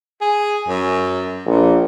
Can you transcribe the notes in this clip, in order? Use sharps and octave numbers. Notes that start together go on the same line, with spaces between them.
G#4
F#2
A#1 A#2